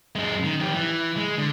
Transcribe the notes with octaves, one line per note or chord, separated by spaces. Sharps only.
F#2 G#3
D#3
F2 G4
E3
G#3
D3